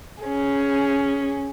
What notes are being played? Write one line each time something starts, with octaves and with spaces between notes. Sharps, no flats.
C#4 G#4